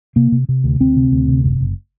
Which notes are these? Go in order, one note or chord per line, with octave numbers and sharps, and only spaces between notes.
C3 A#3
C3
C3
D2
D2 C4
C3
D2
C3
F#1
F#1